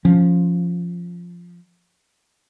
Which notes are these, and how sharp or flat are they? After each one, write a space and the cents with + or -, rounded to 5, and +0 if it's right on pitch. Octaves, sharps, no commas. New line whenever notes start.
F3 +0 C#4 +0